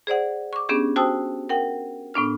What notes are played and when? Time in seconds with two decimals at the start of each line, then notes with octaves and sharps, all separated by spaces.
0.07 G#4 C5 D5 F#5
0.53 C#6 D6
0.69 B3 C#4 D4 G4 G#4
0.96 F#4 C5 G5 A5 D#6 E6
1.49 A#4 F#5 G5
2.14 A2 B3 D4 F6